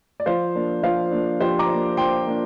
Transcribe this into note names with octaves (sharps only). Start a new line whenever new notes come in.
D5
F3 C5 F5
A#3 D4
F3 C5 F5
A#3 D4
F3 G4 C5
A#5 D6
A#3 D4
F3 G5 C6
A#3 D4